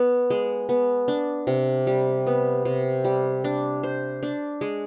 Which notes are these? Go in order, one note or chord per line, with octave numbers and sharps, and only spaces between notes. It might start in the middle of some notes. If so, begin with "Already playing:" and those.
Already playing: B3
G#3
B3
D4
C3
G3
B3
C3
G3
D4
C5
D4
G#3